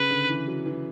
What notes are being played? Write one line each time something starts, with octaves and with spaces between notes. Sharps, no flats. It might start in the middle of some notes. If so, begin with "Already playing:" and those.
Already playing: C#3 B4
D3
E3
F#3
E3